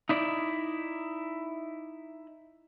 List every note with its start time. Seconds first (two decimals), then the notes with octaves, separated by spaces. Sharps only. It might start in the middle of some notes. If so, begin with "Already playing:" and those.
0.09 D#4 E4 D5